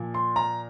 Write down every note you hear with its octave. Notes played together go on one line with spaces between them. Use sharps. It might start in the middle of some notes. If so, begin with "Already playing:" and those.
Already playing: A#2 F3
C6
A#5